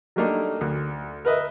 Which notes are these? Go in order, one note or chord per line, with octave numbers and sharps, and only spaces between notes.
F#3 G3 A3 A#3 D4 D#4
D2
A#4 B4 D#5 E5